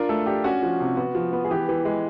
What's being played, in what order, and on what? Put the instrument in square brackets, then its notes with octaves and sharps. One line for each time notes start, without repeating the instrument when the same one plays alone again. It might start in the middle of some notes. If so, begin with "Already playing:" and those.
Already playing: [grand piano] D4 F4 A#4
A3 A4
D4 G4
C#4 F#4
F3
C3
B3 F#4
F3
B3
G#4
E3 G4
E3
G#3